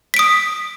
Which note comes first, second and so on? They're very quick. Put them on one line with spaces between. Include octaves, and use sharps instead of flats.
B6 D7 D#6